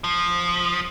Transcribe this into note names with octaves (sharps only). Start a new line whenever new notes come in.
F3